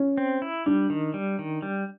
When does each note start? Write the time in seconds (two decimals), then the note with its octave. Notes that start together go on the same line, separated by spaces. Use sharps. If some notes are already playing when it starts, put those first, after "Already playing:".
Already playing: C#4
0.18 C4
0.42 E4
0.66 G3 D4
0.90 D#3
1.14 G3
1.39 D#3
1.62 G3